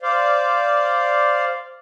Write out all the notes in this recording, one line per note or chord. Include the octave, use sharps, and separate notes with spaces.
C5 D5 F5